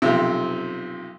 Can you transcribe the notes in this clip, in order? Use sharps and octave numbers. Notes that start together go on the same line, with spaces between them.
B1 F#2 C3 F3 E6